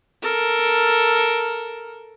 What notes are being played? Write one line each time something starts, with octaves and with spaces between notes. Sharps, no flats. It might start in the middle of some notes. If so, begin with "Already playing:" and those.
A4 A#4